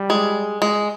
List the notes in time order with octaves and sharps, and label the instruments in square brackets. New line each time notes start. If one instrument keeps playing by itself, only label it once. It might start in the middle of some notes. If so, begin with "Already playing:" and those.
Already playing: [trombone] G3
[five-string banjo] G#3
G#3